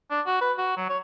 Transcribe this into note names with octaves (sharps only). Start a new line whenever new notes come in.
D4
F#4
B4
F#4
F#3
C#5